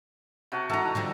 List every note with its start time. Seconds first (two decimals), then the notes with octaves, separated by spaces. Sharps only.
0.52 C3 F#4 A5
0.70 E3 D#4 A4 A#5
0.95 D3 F3 G3